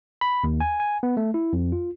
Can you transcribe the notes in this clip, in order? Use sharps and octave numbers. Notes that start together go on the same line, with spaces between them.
B5
D#2
G#5
G#5
B3
A3
E4
F2
F4